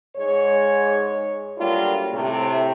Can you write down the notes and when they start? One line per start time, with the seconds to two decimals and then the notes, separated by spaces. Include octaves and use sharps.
0.17 G#2 G#3 C#5
1.57 F#3 G3 A3 A#3 D4 F4
2.12 A2 C3 A3